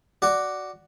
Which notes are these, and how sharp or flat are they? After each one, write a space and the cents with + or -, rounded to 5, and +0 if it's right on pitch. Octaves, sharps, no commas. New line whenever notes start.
F#4 +10 D5 +0